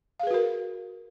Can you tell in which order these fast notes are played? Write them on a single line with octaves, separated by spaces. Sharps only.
F5 G#4 B4 F#4 A#4